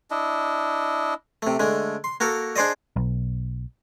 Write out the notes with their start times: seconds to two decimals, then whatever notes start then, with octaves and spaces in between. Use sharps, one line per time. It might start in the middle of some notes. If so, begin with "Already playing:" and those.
0.11 D4 E4 D#5
1.42 C3 A3
1.59 D3 G#3 A3
2.04 C6
2.20 A#3 F#4 A4 A#4
2.56 D4 G#4 C5 D5 D#5
2.96 B1